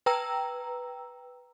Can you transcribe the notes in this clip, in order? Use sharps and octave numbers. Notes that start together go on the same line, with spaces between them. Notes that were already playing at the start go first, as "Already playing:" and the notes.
B4 G5 A#5 E6